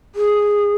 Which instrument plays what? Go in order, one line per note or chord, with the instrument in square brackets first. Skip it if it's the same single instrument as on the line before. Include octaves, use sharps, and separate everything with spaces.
[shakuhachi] G#4